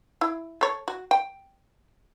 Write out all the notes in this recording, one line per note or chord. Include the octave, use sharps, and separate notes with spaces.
E4
A4 C#5
F#4
G5